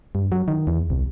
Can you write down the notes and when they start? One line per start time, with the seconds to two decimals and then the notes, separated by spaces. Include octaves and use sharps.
0.15 G2
0.32 F#3
0.48 D#3
0.67 E2
0.90 C2